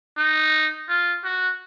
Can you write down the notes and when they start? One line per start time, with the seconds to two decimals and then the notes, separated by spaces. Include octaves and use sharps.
0.18 D#4
0.89 F4
1.24 F#4